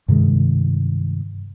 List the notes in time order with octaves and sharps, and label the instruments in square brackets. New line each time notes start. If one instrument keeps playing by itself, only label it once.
[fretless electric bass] G2 C3 D#3 G#3